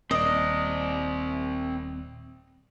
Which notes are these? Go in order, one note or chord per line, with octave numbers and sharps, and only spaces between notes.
D#1 C4 D5 D#5